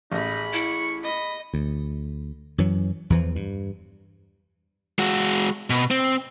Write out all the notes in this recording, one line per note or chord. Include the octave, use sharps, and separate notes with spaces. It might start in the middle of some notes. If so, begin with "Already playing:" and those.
A1 D#4 G#4 B5
E4 C#6
D#5 B5
D2
F#2 E3 F#3
E2 E3 F3
G2
G#3 F#4
B2
C4